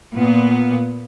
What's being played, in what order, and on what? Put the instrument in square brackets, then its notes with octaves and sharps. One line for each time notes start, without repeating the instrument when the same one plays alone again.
[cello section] A#2 B3